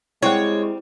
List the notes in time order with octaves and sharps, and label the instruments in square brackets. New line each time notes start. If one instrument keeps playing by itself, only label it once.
[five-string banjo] G3 C4 F#5 [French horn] G#3 [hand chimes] E4 [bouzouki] C#5